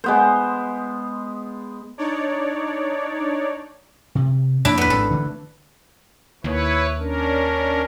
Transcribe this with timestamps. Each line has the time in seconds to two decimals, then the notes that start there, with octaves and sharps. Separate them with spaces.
0.04 G#3 B3 C5
1.98 D4 D#4 C#5 D5
4.15 C3
4.65 F2 A#3 D4 E4
4.78 B3 B4
4.90 G#1 G#3 C4 A4
5.11 D3 E3 A3
6.44 D#2 E4 B4 C#5
6.99 C#4 D4 A#4